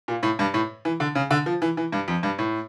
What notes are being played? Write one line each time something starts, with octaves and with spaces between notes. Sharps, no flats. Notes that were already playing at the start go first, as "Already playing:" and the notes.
A#2
A2
G2
A2
E3
D3
C#3
D3
F3
E3
E3
G2
F2
G2
A2